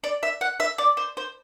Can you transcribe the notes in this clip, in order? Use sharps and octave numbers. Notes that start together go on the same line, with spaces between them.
D5
E5
F#5
E5
D5
C5
C5